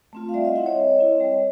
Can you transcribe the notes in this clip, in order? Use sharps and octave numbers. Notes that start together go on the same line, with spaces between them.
A3 C4 F4
F5
G3 D5 E5
D#5 F5
C4 E4 E5 F#5
C#5 D#5
G3
C4 E4
G3